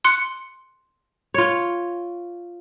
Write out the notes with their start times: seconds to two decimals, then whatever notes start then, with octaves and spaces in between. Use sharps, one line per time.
0.05 C6 F#6 C#7
1.34 F4 C#5